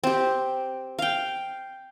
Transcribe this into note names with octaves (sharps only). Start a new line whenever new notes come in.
C4 G4
F5 G5